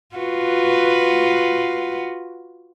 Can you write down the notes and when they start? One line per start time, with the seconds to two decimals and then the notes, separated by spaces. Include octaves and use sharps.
0.16 F4 F#4 B4